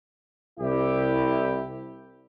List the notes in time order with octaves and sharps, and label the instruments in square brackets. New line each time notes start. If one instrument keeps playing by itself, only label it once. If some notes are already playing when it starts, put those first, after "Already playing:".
[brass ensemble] C2 E4 G4